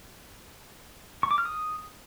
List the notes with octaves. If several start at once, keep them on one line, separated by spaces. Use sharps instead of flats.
C#6
D6
F6
D#6